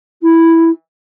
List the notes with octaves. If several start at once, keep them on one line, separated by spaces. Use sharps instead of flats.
E4